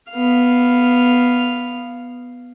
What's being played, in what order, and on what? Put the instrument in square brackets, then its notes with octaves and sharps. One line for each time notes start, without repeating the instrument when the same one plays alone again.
[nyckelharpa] B3 F5